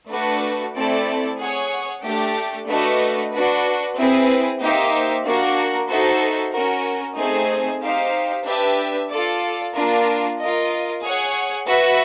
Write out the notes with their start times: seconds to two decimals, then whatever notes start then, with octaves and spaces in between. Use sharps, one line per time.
0.11 A3 D4 F#4 B4
0.75 A3 C4 E4 A4 D5
1.39 G#4 C#5 F#5
2.03 A3 D4 G4
2.68 A3 D4 F#4 B4 D#5
3.31 D4 F#4 B4
3.96 C4 E4 G#4 B4
4.60 A#3 D#4 G4 C5 E5
5.25 A#3 D4 F#4 A#4
5.89 D#4 F#4 A4 C5 E5
6.53 C#4 F#4 A#4
7.17 A3 C4 D#4 G#4 C5
7.82 D#4 G4 C5 F5
8.46 D4 G4 B4 E5
9.11 F4 A4 D5
9.74 A#3 D4 F4 A#4
10.39 F4 A#4 D#5
11.03 G#4 C#5 F#5
11.67 F#4 B4 E5